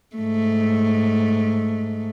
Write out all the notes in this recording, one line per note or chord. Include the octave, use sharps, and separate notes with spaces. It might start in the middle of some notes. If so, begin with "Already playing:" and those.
G#2 A3